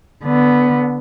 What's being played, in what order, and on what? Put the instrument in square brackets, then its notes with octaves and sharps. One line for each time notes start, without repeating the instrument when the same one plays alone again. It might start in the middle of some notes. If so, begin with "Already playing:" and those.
[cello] D3 B3